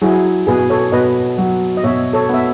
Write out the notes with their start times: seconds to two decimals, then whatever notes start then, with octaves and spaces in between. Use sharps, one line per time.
0.02 F#3 E4 G#4
0.47 B2 G#4 B4
0.70 A4 C#5
0.92 B2 B4 D#5
1.38 F#3
1.77 D#5
1.83 B2 C#5 E5
2.13 A4 C#5
2.29 B3 E5